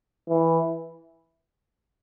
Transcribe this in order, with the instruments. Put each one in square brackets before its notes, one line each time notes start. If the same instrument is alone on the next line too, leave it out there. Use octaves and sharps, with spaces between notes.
[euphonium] E3